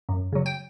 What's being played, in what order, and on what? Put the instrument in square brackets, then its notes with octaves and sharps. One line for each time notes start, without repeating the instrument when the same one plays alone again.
[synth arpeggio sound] F#2
C#3 F#3
G5